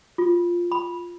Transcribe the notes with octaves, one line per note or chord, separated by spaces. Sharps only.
F4
B5